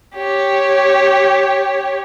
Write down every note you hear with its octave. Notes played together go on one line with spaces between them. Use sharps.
G4 C#5